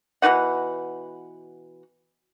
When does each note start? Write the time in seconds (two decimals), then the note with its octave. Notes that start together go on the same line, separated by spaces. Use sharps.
0.22 B2 E3 D#4 F#5